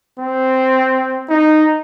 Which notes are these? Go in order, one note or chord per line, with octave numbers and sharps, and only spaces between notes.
C4
D#4